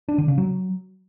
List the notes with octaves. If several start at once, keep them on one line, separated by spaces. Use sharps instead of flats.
D4
D3
C#3
F#3